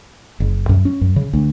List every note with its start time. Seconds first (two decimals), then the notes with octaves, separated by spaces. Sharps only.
0.40 F#1
0.69 F#2
0.85 C#4
1.01 F#2
1.16 C#3
1.33 D2